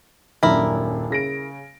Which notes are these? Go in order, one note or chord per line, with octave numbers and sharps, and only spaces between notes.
D#1 F#2 D4 E4 A#4
C#3 A#6 D7